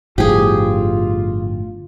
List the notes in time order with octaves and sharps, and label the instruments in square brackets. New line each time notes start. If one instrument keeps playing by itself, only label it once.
[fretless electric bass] G1 A2 F3 [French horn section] F4 [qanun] G4 G#4